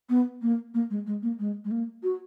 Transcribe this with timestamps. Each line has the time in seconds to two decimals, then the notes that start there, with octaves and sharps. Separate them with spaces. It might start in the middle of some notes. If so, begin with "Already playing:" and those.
0.09 B3
0.42 A#3
0.74 A#3
0.90 G#3
1.07 G#3
1.23 A#3
1.39 G#3
1.65 G#3
1.71 A#3
2.03 F#4